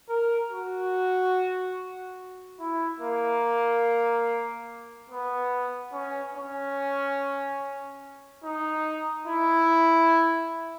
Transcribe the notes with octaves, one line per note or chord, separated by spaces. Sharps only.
A#4
F#4
E4
A#3
B3
C#4
C#4
D#4
E4